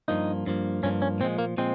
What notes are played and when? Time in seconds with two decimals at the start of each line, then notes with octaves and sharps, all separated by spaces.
0.08 G2 F3 A#3 D#4
0.46 G2 F3 A#3
0.83 G2 F3 A#3 C#4
1.02 C#4
1.20 A#2 F3 G#3 C4
1.39 A#3
1.57 A#2 F3 G#3 C4